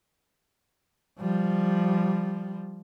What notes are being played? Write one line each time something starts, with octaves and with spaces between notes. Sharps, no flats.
F3 G3